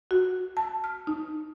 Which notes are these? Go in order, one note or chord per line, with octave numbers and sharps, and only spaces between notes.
F#4
A5
F6
D#4